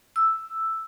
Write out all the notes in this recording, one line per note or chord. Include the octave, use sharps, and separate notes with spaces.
E6